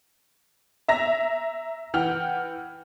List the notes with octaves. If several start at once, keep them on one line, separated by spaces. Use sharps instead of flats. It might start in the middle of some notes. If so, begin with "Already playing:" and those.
E5 A#5 A#6
E3 F#5 G5 F6